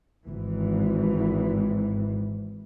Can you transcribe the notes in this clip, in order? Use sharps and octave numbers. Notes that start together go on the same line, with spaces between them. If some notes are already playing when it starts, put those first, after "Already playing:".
G#1 G#2 E3